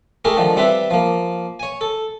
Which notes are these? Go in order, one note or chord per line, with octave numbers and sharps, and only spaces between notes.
A3 E4 G4 G#4 A#4
D3 D#3 F3
G3 C4 E4 G4 B4 E5
F3 A#3
C#5 G#5
A4